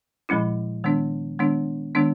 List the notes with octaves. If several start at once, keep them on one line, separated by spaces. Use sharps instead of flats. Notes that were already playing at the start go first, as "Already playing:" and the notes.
A#2 F3 G#3 C#4 E4
D#3 G#3 B3 D4
D#3 G#3 B3 D4
D#3 G#3 B3 D4